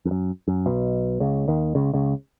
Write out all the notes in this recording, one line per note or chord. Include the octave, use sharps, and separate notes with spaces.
F2
F#2
F#2
B1 B2
C#2 C#3
D#2 D#3
C#2 C#3
C#2 C#3